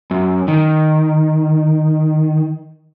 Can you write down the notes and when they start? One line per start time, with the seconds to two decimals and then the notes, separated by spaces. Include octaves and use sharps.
0.11 F#2
0.48 D#3